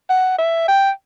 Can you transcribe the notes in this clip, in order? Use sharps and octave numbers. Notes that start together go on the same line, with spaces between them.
F#5
E5
G5